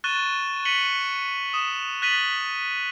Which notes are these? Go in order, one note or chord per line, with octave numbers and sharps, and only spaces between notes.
C#6 F#6 A6 D#7 E7 G7
B6 C#7 D#7 F#7 G7
D#6 E7
F#6 A6 B6 D#7 F#7 G7